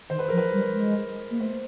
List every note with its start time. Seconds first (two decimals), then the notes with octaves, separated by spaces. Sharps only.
0.10 D#3 C5
0.19 B4
0.29 F3 A#4
0.38 B4
0.53 G3
0.75 G#3
1.31 A#3
1.40 A3 C5